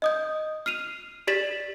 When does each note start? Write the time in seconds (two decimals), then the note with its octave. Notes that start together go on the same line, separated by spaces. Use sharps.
0.02 D#5 D#6 G6
0.66 F6 C7 D#7 F7
1.27 G4 D5 A6 B6 E7 F#7